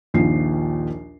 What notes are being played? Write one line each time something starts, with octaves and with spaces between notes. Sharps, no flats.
A#1 D#2 F3 A#3 C7